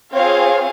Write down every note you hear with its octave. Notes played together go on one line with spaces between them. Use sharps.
C4 F4 G#4 C#5 F5